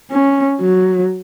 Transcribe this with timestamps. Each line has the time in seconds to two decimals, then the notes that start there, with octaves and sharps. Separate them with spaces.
0.11 C#4
0.61 F#3